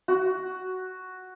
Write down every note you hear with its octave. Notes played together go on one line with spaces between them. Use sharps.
F#4